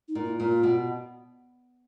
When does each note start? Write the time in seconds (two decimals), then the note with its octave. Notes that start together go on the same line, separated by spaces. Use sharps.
0.08 D#4
0.15 A#2
0.23 E4
0.40 A#2 F4
0.63 B2